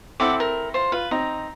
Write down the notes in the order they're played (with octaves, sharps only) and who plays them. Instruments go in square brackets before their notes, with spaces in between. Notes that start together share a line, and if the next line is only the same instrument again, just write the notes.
[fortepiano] C4 E4 A4 [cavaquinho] F#5 B5 D6
[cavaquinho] A#4
F4 C5
[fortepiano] F4 [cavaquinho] B4
[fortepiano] C4 D#4 [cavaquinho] A#5